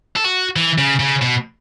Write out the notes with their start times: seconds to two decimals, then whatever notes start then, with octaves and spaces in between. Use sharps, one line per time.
0.16 A4
0.24 F#4
0.56 E3
0.78 C#3
1.00 C#3
1.22 B2